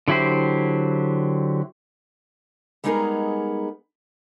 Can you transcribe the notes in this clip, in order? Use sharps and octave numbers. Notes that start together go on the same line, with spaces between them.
D3 F#3 E4 G4 C5
G3 G#3 B3 D#4 G#4 A#4